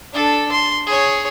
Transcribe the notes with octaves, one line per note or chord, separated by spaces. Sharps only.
D4 A4
C6
G#4 C#5